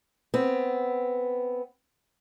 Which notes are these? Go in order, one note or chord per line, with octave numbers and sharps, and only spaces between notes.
B3 C4